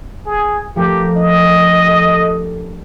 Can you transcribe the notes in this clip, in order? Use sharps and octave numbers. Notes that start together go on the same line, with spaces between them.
G#4
F3 A3 G4 A#4
D4 D#5
G4 A4